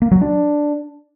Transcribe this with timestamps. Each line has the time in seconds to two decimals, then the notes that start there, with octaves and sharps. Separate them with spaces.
0.02 A#3
0.11 F#3
0.21 D4